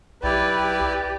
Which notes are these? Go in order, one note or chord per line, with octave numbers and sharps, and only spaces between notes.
B1 E4 G4 B4 D5